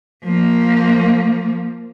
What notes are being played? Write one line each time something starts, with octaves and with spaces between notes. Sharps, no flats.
F3 A#3